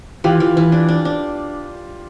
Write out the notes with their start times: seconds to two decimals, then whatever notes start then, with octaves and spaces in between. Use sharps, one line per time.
0.24 E3 F4 G4
0.40 E3
0.57 E3
0.72 D4
0.88 D4
1.05 D4